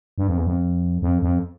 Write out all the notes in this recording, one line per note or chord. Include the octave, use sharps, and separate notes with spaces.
G2
F2
E2
F2
F2
F2